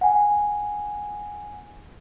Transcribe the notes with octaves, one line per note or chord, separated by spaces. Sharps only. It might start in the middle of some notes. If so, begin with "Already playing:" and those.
F#5 G#5